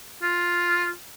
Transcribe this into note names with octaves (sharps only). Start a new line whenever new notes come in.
F4